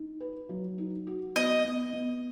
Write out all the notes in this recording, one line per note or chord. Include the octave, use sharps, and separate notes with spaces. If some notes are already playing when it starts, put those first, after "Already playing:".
Already playing: D#4
B4
F#3
D#4
F#4
B3 D#5
B3
B3